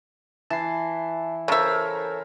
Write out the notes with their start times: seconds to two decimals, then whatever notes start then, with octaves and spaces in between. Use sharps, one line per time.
0.50 E3 A5 C7
1.48 C#3 A4 A#4 C5 C#5 E5 A5